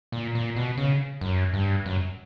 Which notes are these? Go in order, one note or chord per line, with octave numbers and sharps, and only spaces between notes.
A#2
A#2
B2
C#3
F#2
G2
F#2